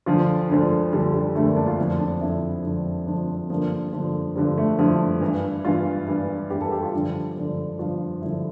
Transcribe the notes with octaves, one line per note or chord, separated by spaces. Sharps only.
D2 D3 F3 F4
D2 D3 F3
D2 D3 F3 G3
G3
D2 D3 F3 A3
A#3
D4
F4
F2 D3 F3 E4
D4
F2 D3 F3 E4
F2 D3 F3
F2 D3 F3 D4
C4
G2 D3 F3 A#3
G2 D3 F3
G2 D3 F3 G3
A3
G2 D3 F3 E4
G2 E3
G2 E3 F4
G2 E3
G2 E3 G4
A4
G4
F4
G2 D3 F3
G2 D3 F3
G2 D3 F3 F4
G2 D3 F3 E4